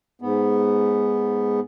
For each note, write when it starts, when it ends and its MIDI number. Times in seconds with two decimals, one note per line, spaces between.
0.22 1.60 44
0.22 1.60 59